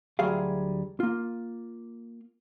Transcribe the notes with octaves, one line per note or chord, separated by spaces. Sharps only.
D2 F#3 G3 G#4 E5 F5
A#3 F4